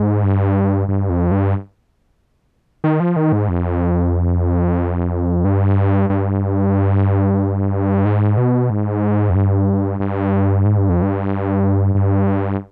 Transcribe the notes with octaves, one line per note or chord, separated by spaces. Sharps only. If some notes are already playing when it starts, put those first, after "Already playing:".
Already playing: G#2
G2
G2
F2
G2
D#3
F3
D#3
G#2
F2
G2
G2
G#2
B2
G#2
F2
G2
G2
G#2
G2
F2
G2
G2